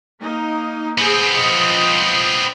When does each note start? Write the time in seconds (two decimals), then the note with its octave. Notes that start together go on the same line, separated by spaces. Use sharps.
0.21 A#3 D#4
0.98 B3 C4 G#4
1.33 F3 F4 D#5